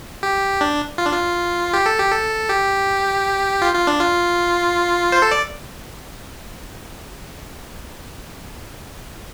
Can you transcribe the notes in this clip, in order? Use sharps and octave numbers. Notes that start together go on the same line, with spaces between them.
G4
D4
F4
D4
F4
G4
A4
G4
A4
G4
F4
F4
D4
F4
C5
A4
D5